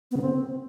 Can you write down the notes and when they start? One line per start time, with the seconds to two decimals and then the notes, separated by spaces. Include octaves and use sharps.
0.11 B3
0.16 C#3
0.21 C4